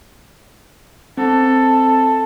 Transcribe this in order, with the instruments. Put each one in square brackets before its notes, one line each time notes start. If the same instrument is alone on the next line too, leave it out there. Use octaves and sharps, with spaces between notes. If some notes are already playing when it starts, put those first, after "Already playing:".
[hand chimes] C4 [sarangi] A4